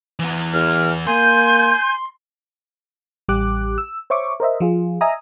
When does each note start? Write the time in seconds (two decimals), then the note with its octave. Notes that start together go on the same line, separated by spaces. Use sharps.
0.19 E3 B3
0.53 E2 F6
1.07 A#3 G#5 C6 G6
3.29 A1 G3 G4 D6 F#6
3.78 E6
4.10 C5 C#5 E5 C#6 D6
4.40 A#4 C5 D#5 E5
4.60 F3 F4 G#4
5.01 D#5 E5 G#5 A#5 D#6